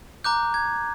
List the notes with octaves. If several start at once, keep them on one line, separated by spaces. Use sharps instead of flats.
A#5 D6 F#6 G6
G#6